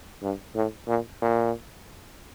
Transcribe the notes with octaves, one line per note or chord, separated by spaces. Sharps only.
G2
A2
A#2
A#2